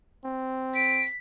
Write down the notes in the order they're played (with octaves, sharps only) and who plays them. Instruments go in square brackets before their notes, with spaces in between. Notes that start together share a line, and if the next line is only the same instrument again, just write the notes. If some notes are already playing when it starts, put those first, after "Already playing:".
[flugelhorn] C4
[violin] B6 [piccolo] D7